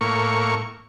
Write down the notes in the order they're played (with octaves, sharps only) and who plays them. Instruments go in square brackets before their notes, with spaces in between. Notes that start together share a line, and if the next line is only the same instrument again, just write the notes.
[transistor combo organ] A2 A#3 C#6